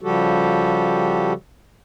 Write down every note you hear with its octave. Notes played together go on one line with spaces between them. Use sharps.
C#3 F3 G3 F#4 G4 A4